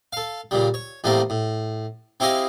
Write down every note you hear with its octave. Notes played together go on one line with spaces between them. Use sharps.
A4 F5
A#2 C#3 G3
C#5
E2 A2 G3 A3 A#3 C4
A2
C4 E4 G4 G#4 D#5 F5